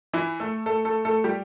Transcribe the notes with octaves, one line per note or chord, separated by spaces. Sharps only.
E3 E4
A3 A4
A3 A4
A3 A4
A3 A4
G3 G4